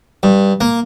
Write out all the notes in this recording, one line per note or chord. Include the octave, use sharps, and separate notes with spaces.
G2
A#3